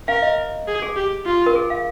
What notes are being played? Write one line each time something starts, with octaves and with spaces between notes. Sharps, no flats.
A#4 F5
D#5
G#4
G#4
G4
F4
A#4
G#4
F5